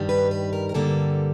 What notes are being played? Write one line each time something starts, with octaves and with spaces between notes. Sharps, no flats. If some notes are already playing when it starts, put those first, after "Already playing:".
Already playing: G2 D#3 G3
B4
B4
A#4
A#4
G2 D3 G3 A#3 A4